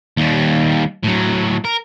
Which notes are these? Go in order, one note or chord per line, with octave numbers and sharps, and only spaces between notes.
D#2 G3
A2 F#3
A#4